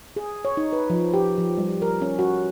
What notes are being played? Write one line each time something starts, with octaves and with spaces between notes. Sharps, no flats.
G#4
C#5
D#4
B4
F3
G4
F3
G3
A#4
C#4
F#4